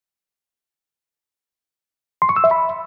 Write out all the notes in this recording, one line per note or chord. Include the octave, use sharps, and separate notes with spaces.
C6
C#6
E6
E5
B5